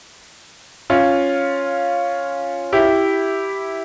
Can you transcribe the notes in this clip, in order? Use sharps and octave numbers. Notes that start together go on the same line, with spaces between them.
C#4 F4
E4 G4